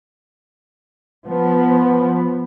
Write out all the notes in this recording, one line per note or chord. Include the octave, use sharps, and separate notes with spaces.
F3 B3